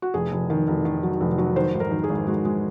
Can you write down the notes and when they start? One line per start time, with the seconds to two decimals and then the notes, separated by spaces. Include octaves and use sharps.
0.02 F#4
0.14 F1 G#4
0.32 F1
0.50 D#3
0.68 F1
0.85 D#3
1.03 F#3
1.20 F1
1.38 F#3
1.56 D#3 C5
1.74 G#1
1.80 A#4
1.91 D#3
2.04 G#4
2.09 G#1
2.27 G#3 F#4
2.45 G#3